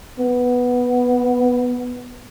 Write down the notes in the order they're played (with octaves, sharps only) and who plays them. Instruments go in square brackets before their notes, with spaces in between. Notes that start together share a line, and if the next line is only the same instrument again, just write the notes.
[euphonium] B3